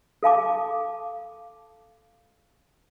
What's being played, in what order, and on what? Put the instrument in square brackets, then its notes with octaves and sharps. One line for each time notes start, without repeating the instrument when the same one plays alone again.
[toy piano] A4 F5 A5 D6